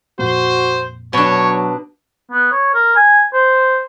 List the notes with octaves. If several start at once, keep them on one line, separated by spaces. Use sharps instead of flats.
F2 A#2 A#3 F#4 C5
B2 F#3 D4 C#5
B3
C#5
A#4
G#5
C5